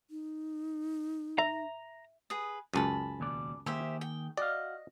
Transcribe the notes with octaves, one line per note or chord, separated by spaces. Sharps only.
D#4
E5 A#5
G#4 B4 D#6
C#2 F#2 G#5 A5 B5
D#2 B2 D5
D#3 A#3 G4 G#4 C5 E5
G5
F#4 D5 D#5 F5